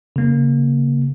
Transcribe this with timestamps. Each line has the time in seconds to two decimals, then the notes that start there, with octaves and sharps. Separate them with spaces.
0.16 C#3 A#3